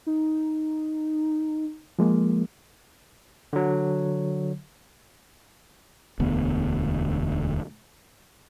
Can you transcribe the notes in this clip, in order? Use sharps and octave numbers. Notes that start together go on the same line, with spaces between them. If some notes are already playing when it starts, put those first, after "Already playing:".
D#4
F3 G#3 A#3
D3 F#3
E1 D2 B3